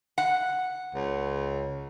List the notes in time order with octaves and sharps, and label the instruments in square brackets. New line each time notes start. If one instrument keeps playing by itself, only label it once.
[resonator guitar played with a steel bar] F#5
[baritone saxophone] C#2